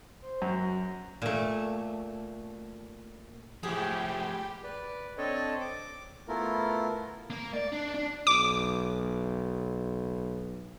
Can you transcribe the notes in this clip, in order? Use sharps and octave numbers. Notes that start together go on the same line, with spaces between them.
C5
F#2 F#4
A#2 A3
G#2 F3 A3 E4 G4 G#4
B4 D5
C4 D4 A4 C#5 D#5
D6
A3 B3 E4 F4 A#4
A#3
D5
D4
D4
B1 D6